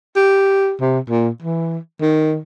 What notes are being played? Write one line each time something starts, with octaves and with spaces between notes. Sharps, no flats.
G4
C3
A#2
E3
D#3